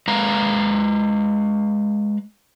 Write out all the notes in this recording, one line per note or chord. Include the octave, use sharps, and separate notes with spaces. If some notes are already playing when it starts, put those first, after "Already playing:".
G#3 B4 F5 A#5